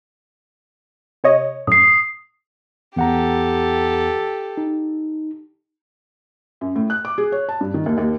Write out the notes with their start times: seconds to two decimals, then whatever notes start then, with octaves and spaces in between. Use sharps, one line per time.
1.24 C3 C#5 D#5
1.67 F#2 A2 D#6 C7
2.96 E2 G4 A4 F#5 A#5
4.57 D#4
6.61 F#2
6.76 A2
6.90 F#6
7.05 D6
7.18 G#4
7.32 C#5
7.49 A5
7.61 G2
7.74 D#3
7.86 D#2
7.98 D#2